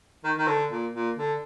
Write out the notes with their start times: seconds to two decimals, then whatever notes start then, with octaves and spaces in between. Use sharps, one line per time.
0.24 D#3
0.38 D#3
0.47 D3
0.70 A#2
0.93 A#2
1.16 D3